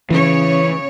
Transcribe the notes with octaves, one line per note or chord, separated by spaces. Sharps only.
C#3 E3 C#5